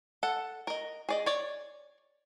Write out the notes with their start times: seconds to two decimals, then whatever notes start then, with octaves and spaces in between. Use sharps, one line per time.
0.23 A4 F#5
0.67 A#4 D#5
1.09 G#4 D5 D#5
1.26 C#5 D5